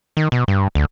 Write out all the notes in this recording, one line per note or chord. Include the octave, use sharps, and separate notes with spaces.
D#3
B2
G2
D2